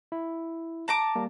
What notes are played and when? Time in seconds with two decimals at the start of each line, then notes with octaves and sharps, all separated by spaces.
0.12 E4
0.88 A5 A#5 D6
1.16 G3 A#3